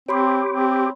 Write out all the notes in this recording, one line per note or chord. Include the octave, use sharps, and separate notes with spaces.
C4 G4 C#5 B5 C6
C4